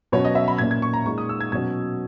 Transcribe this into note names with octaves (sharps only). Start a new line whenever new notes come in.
B2 F#3 C#4 C#5
D#5
E5
B5
A#2 A#3 C#4 G#6
G#6
C#6
A#5
A#2 G#3 D#4 C#6
D#6
E6
G#6
B2 F#3 C#4 G#6